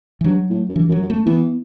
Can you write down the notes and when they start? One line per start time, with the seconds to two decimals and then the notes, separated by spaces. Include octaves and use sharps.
0.21 E3
0.24 G2 F#3
0.50 A2
0.69 F#2
0.75 G2 E3
0.89 F#2
0.92 F#3
1.01 F#2
1.10 A3
1.26 E3 B3